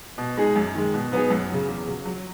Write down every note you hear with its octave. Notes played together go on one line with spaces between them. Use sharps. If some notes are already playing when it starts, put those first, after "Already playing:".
B2
G#3 D#4 G#4
F#2
D#3 G#3
B2
F#3 B3 D#4 G#4
F#2
C#3 F#3
E2
C#3 F#3
F#3